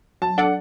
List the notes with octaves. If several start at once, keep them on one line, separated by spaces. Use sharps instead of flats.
F#3 A5
D4 A4 D5 F#5